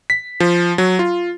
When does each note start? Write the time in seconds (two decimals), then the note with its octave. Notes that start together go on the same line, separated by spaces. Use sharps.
0.10 B6
0.40 F3
0.78 F#3
0.99 F4